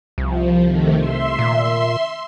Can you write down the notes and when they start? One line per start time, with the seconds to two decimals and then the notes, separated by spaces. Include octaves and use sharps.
0.18 C2 F3
0.62 C3 D#3 A3
0.98 E5 C6
1.39 A#2